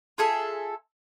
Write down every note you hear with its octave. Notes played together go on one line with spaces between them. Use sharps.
F4 G#4 A4 E5